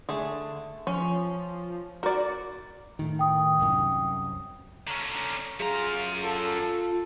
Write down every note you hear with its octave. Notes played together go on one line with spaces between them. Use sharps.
D3 A3 G#4
F3 C#4
F#4 A#4 D5
A2 D#3
G5 D#6
C2 F#2
D3 C#4 A#5
F#2 F4 G#4 A#5
F4 A4